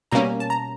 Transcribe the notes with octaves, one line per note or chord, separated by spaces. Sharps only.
B2 G3 A#3 C#4 A#5
A5
A#5